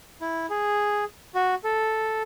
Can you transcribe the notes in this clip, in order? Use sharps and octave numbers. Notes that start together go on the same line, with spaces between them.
E4
G#4
F#4
A4